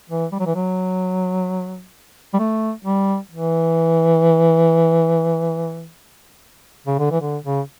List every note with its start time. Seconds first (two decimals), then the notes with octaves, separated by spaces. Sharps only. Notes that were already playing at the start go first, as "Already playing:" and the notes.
0.10 E3
0.32 G3
0.39 F#3
0.46 E3
0.55 F#3
2.34 G3
2.39 A3
2.85 G3
3.31 E3
6.87 C#3
6.99 D3
7.11 E3
7.21 D3
7.44 C#3